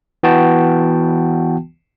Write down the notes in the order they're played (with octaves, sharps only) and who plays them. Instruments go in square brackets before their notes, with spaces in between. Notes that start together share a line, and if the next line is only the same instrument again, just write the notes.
[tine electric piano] E3 B3 F#4 G5 A5